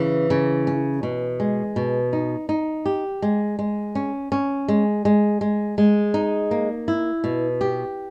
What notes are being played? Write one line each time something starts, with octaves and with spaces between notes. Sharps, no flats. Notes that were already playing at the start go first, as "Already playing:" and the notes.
Already playing: C#3 E3
C#3
C#4
B2
G#3
B2
D#4
D#4
G4
G#3
G#3
C#4
C#4
G#3
G#3
G#3
G#3
D#4
A#3
E4
B2
G4